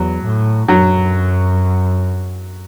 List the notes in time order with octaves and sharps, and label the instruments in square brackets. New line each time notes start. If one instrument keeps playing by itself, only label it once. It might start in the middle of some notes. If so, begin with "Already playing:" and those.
Already playing: [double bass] E2 [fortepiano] F#3
[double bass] A2
[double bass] F#2 [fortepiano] F#3